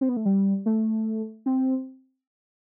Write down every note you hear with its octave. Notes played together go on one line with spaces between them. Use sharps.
C4
B3
A3
G3
A3
C4